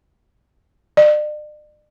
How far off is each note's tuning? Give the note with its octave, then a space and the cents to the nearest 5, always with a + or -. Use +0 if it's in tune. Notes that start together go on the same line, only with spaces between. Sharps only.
D5 +40